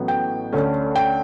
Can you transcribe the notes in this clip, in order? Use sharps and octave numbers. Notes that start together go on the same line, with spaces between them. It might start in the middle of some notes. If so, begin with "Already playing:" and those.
Already playing: A1 A2 F#3 B3
G5
D2 D3 A3 C#4
G5